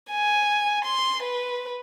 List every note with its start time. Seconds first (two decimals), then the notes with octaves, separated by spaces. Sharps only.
0.11 G#5
0.85 C6
1.23 B4